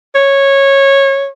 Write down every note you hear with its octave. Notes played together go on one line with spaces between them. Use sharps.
C#5